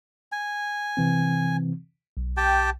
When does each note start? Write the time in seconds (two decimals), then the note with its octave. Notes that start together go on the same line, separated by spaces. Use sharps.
0.32 G#5
0.97 C3 E3 C4
2.17 B1
2.37 G4 G5 A5